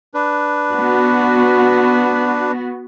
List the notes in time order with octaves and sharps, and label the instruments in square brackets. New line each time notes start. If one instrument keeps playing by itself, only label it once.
[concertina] D4 B4
[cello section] B3 F#4